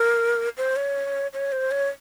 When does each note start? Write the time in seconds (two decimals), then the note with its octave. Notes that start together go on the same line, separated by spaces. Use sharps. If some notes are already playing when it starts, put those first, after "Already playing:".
Already playing: A#4
0.57 C5
0.76 C#5
1.33 C#5
1.52 C5
1.71 C#5